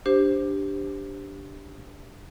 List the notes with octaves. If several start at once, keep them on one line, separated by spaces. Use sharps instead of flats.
D4 G4 C5